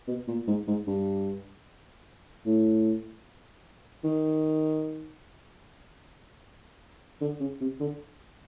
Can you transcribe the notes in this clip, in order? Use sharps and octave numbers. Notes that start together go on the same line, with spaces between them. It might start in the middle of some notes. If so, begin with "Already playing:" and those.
B2
A#2
G#2
G#2
G2
A2
D#3
D3
C#3
C3
D3